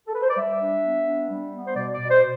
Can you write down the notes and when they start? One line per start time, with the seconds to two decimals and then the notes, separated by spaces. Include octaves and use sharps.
0.07 A4
0.15 B4
0.22 C5
0.29 D5
0.37 G3 E5
0.60 D4
0.83 B3
1.06 D4
1.30 G3
1.52 B3
1.66 C5
1.75 B2 D5
1.93 D5
1.98 B2
2.10 C5